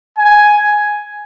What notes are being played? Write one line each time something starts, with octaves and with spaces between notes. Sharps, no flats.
G#5